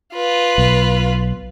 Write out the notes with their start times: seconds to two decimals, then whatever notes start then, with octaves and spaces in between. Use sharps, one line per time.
0.14 F4 B4
0.58 B1